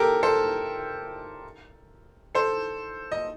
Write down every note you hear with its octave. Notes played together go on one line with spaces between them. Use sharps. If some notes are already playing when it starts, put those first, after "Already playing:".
Already playing: G4 A4 A#4
A4 C5
A4 C5
D#5